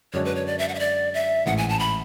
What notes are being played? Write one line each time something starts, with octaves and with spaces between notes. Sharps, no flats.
F#2 D3 G#3 D4 F#4 C#5
B4
C#5
D5
E5
F#5
E5
D5
E5
A1 G#2 E3 F#5
G#5
A5
B5